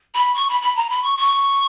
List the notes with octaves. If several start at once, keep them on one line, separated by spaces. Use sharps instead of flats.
B5
C#6
B5
B5
A#5
B5
C#6
C#6